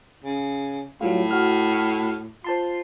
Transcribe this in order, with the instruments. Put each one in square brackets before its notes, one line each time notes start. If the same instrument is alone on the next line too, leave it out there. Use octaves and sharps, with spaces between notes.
[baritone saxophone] C#3
[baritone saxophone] A2 [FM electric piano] F#3 G3 F4
[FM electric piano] F#4 F6
[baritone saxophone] F4 [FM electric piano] C5 A5 C6